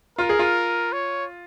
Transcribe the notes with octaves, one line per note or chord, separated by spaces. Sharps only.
F4 A#4
G#4
F4
C#5